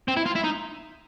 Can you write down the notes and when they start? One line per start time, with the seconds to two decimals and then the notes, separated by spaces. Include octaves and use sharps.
0.08 C4
0.17 E4
0.26 F4
0.36 E4
0.44 D#4